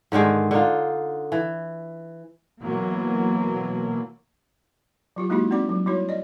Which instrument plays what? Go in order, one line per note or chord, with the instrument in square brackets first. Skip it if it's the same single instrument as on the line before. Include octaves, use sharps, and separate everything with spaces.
[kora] G#2 D3 D#3 G#3
D3 D#4 F4
E3
[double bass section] B2 E3 F#3 A#3
[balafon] F#3 F4 G4
G#3 A#3 D#4 E4 F#4 G4
C4 D#4 F#4 D5 D6
F#3
G3 E4 F#4 C#5
D5 D#5